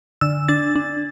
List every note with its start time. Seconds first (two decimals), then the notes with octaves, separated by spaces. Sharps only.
0.21 D3 E6
0.48 D4 A6
0.75 D4